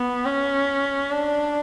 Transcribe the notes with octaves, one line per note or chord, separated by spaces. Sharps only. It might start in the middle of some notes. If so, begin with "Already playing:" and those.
Already playing: B3
C#4
D4